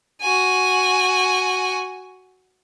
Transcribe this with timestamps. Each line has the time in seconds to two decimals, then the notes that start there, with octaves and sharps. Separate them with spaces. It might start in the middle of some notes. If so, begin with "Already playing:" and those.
0.22 F#4 G#5